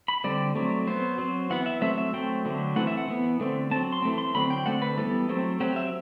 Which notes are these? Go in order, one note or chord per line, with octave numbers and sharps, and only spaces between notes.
B5
D3 G3 C4 D5
F#3 A3 C4
F#3 B3 C5
F#3 C4
E3 B3 F#5
E5
F#3 A3 C4 E5
E5
F#3 A3 C4 G5
D3 F#3 A3
E3 A3 C4 F#5
E5
F#5
E3 B3
D3 A3 C4
F#3 C4 A5
C6
E3 A3 C4
C6
D3 F#3 C4 B5
G5
D3 A3 C4 F#5
B4
E3 G3 B3 A4
F#3 A3 C4
F#3 C4 G4
E5